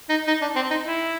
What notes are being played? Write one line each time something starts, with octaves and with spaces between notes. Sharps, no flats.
D#4
D#4
D4
C4
D#4
E4